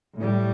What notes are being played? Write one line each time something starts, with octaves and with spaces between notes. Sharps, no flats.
A2 G3